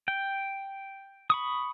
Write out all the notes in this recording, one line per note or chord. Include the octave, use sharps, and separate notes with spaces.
G5
B5 C#6 D#6